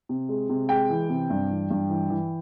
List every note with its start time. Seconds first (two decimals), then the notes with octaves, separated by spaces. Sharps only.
0.09 C3
0.29 G#3
0.50 C3
0.69 G#3 G5
0.90 E3
1.10 C3
1.30 G2
1.50 E3
1.71 G2
1.90 E3
2.10 E3